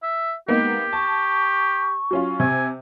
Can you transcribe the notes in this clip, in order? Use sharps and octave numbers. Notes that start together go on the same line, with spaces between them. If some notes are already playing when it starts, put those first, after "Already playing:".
E5
G#3 A#3 B3 D#4 G4
A5 C#6
F#3 C#4 F4
C3 G#5